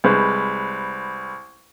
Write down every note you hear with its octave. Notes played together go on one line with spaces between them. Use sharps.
C2 G#3 B4 C5